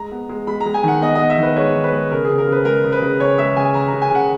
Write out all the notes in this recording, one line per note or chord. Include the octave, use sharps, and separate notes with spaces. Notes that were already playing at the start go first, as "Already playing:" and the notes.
Already playing: G#3 A#5
B3
G#3
G#3 B5
A#5
G#3
G#5
D#3 F#5
B3 D#5
D#5
B3
E5
D#3 B4
G#3 C#5
D#3
B4
G#3
C#3 A#4
C#3 G#4
A#4
C#3 B4
G#3 A#4
C#3
B4
C#3
C#3 C#5
G#3 E5
C#3 G#5
C#3 A#5
C#3 A#5
G#5
C#3 F#5